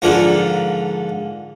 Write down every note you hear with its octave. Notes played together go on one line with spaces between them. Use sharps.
G#2 D3 F3 A#3